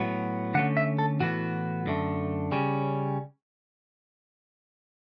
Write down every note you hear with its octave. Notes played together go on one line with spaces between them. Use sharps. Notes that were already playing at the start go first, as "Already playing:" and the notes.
Already playing: A2 F#3 B3
D3 A3 C#4 F#5
E5
A4
A2 E3 B3 F#4
F#2 D3 A3
C#3 G3 C#4